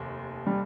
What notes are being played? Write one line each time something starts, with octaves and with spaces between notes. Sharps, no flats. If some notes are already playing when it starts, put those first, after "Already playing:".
Already playing: F1 D#2
G3